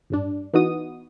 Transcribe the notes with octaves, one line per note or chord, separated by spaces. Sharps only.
A1 G2 D4
E3 B3 D#4 F#4 D#6